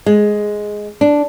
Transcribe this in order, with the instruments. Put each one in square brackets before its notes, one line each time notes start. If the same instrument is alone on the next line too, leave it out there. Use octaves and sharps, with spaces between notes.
[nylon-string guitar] G#3
D4